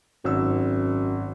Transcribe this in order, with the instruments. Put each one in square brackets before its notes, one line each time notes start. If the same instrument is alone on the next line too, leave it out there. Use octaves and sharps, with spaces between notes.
[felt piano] G#1 E6 [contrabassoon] F#2